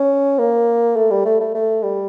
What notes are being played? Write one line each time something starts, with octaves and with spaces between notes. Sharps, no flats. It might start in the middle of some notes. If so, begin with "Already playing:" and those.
Already playing: C#4
A#3
A3
G3
A3
A3
A3
G3